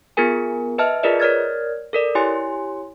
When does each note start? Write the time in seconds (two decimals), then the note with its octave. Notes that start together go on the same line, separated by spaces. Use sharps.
0.17 B3 F4 G#4 A#4 G#5
0.78 B4 D#5 E5 A5 F6
1.03 F4 G#4 A#4 B4 D5 D#5
1.20 A#4 C#5 D5 F6 G#6 A6
1.93 A4 A#4 D5
2.15 E4 G4 C#5 G#5 C6